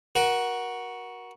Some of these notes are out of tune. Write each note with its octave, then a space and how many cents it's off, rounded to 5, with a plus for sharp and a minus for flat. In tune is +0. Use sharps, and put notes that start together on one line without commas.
F#4 +0 A#4 +30